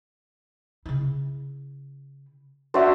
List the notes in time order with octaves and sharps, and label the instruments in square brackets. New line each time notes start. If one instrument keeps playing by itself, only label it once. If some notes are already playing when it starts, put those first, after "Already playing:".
[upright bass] C#3 E4
[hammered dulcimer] D4 F#4 [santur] C5 E5